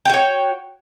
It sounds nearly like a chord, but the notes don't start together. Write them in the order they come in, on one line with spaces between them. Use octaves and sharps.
G5 F#4 C#5